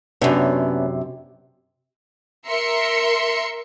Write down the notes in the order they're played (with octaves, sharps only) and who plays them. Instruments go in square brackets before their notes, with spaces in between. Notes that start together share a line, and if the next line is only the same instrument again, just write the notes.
[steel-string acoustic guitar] F#2 C3 [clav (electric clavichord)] B3 C#4 D4
[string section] A#4 E5 C6 C#7